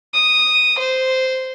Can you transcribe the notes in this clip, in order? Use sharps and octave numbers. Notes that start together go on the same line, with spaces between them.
D#6
C5